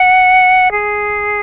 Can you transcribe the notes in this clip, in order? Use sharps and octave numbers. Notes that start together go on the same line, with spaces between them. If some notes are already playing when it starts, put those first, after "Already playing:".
Already playing: F#5
G#4